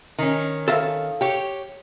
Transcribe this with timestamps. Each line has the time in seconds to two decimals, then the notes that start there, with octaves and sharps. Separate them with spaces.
0.18 D#3 C#4
0.68 A4 E5 F5
1.21 G4 C#5